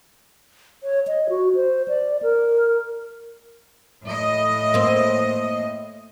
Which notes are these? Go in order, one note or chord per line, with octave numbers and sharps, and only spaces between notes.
C#5
D#5
F#4
C5
D5
A#4
A2 D#5
A#3 C4